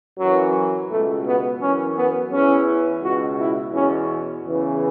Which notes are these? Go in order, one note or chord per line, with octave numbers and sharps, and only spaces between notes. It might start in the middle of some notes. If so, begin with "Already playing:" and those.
F#2 E3 F#3
C#2 B2 A3
B3
F#2 E3 C#4
B3
E2 E3 C#4
C#2 B2 F#4
E4
E2 B2 C#4
E2 C#3 E3